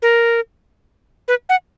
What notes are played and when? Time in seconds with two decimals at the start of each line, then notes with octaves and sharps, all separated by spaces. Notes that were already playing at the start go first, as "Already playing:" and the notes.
0.02 A#4
1.28 B4
1.49 F#5